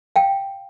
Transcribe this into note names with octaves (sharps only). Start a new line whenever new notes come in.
F5 G5